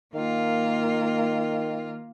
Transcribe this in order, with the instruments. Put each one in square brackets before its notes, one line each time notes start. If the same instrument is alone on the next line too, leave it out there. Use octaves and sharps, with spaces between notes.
[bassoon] D#3 [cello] A#3 F4